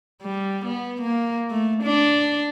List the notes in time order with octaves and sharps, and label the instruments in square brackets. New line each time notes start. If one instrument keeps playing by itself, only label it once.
[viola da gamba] G3
B3
A#3
A3
D4